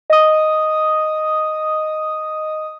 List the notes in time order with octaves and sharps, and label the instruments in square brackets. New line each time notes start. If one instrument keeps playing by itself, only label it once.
[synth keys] D#5 D#6